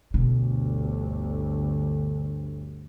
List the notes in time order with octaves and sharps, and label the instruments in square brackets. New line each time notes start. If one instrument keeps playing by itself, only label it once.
[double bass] G1 D2 [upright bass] B2